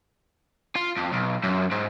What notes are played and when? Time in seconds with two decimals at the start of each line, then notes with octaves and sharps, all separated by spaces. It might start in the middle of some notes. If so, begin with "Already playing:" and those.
0.75 F4
0.96 F2
1.13 B1
1.43 F#2
1.71 G#2